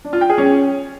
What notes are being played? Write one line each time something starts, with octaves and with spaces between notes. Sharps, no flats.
D4
F4
G5
G#4
C#4